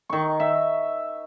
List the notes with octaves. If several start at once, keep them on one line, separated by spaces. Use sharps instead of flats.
D#3 C#6
E5